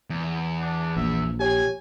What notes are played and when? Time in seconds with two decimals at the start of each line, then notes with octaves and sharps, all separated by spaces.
0.10 E2
0.61 D4
0.97 A#1 E5
1.40 G4 C#5 G#5